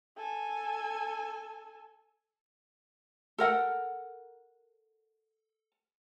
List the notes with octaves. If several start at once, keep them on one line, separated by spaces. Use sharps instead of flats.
A4 G#5
A4 A#4 F#5